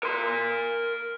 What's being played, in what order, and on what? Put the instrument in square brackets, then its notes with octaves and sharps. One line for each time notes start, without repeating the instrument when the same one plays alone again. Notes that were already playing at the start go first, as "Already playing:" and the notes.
[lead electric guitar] A#4 C6